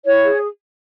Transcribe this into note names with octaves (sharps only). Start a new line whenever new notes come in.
E4 C#5
G#4